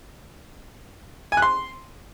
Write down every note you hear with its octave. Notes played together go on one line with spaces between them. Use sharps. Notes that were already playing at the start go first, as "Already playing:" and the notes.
G#5
F#6
C6